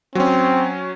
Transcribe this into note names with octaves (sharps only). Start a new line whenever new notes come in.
F#3 C4 C#4